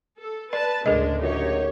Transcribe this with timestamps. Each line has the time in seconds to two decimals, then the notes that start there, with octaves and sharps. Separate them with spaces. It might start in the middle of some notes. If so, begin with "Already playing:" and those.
0.21 A4
0.53 B4 D5 A5
0.86 D2 A2 C#3 G#3 D4 G#4 A#4 D#5
1.22 C#2 F#2 D#4 G4 C#5